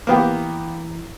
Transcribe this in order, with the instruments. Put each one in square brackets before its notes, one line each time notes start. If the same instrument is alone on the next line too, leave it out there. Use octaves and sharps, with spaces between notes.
[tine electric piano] E3 E4 A#5 [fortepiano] A#3 B3 G4